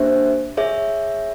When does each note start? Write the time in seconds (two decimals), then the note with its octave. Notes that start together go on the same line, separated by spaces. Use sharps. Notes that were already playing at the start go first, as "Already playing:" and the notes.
Already playing: A#3 D4 G4 C5 E5
0.57 G#4 C#5 E5